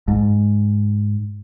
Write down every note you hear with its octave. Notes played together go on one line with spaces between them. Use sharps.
G#2